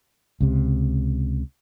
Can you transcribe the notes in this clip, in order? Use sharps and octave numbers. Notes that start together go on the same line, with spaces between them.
C#2 C3